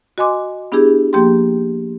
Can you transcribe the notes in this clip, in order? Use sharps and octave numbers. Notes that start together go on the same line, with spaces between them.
F#4 D#5 G#5 C6 D6
B3 D4 E4 G4 G#4
F3 A#3 G4 G5 C6